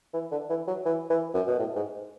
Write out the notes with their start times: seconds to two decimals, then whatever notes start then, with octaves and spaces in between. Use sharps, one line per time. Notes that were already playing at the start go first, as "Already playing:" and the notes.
0.13 E3
0.31 D3
0.49 E3
0.67 F#3
0.85 E3
1.10 E3
1.34 F#2
1.47 B2
1.58 A2
1.76 G#2